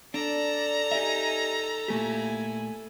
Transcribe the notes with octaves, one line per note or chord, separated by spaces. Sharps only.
D4 A4 D5 A5 A#5
D#4 G4 D5 E5 G#5
A#2 A3 E4 G4 G#5